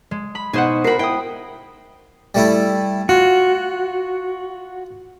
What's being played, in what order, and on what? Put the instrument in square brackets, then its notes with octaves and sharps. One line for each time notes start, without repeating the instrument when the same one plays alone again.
[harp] G#3
B5
[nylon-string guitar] B2 D#4 [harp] G#4 C5 F#5
[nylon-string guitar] F#4 A#4 [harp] B5 C7
[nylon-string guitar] E4 [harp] G5 D#6
[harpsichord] G3 A3 E4
[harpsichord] F4 [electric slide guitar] F#4